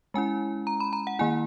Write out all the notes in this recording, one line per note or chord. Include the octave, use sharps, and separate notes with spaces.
G#3 C#4 E4 G#5
A#5
B5
A#5
F#5
D#3 A#3 E4 G#5